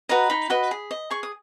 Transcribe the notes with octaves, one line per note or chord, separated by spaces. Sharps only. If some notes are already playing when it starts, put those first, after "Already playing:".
F#4 B4 D#5 A#5
D#4 B5
F#4 B4 D#5
G#4
D#5
G#4 C#6
D#6